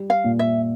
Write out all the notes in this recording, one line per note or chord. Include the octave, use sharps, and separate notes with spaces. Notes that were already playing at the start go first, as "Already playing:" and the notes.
Already playing: G3
F5
A#2
E5